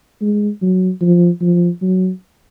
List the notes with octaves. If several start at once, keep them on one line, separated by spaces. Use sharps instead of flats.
G#3
F#3
F3
F3
F#3